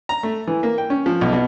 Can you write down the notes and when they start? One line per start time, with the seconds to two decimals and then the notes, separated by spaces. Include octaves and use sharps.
0.09 A#5
0.23 A3
0.47 E3
0.63 A#3
0.78 G5
0.90 C#4
1.06 F3
1.21 B1
1.33 B2